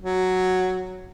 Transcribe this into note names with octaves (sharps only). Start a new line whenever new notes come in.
F#3